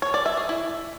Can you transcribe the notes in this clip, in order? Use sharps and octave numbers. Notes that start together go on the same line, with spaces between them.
C#5
D5
E5
G#4
E4